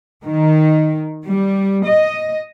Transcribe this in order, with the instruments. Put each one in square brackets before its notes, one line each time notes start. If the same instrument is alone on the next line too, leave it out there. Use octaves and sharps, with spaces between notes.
[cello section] D#3
G3
D#5